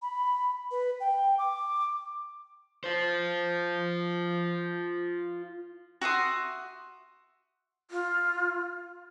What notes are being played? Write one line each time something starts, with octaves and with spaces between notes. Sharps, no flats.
B5
B4
G5
D6
F4 C5
F#4 E5 C6 D#6
F4